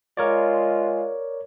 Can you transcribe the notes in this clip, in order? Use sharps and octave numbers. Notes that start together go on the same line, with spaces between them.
G#3 F4 A#4 C#5 D5